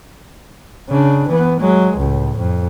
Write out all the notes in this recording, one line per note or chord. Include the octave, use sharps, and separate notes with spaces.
C#3 D4
E3 B3
F#3 G#3
C#2 A2
F2